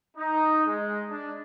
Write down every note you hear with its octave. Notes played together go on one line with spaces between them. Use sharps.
D#4
G#3
D4